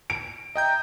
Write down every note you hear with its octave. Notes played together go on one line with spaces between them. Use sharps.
D7
D#5 E5 G5 A#5 G6